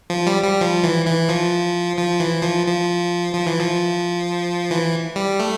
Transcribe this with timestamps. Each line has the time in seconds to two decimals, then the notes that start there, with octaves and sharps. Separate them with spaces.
0.10 F3
0.27 G3
0.43 G3
0.61 F3
0.83 E3
1.06 E3
1.29 F3
1.97 F3
2.20 E3
2.42 F3
2.66 F3
3.34 F3
3.47 E3
3.60 F3
4.71 E3
5.16 G3
5.40 A3